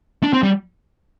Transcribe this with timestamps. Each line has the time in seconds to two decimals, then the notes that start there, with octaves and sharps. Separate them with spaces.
0.23 D4
0.33 C4
0.43 G3